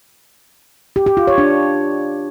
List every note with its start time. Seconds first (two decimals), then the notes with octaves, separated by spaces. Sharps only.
0.96 G4
1.06 G4
1.17 F4
1.27 C#5
1.38 D4